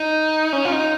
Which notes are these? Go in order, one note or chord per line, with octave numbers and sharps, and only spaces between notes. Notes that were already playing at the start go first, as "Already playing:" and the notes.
Already playing: D#4
C#4
F4
D#4